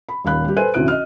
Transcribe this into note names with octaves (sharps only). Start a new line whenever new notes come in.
B5
D#1 D#2 F5 B5 F#6
G3 G4
A4 B4 C5 G#5 F#6 D#7
A1 D2 C3 E3 F#6 D7
D#5 F6